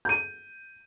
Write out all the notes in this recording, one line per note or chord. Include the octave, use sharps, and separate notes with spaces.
G6 D#7